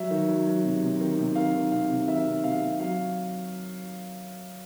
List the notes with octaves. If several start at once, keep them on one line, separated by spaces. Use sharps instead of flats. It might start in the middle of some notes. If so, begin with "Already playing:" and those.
Already playing: F#3 E5
D#3
F#3
F#3
C3
C3
D#3
C3
D#3 F5
D#3
C3 F5
C3
D#3 E5
C3
C3 F5
C3
F#3 F5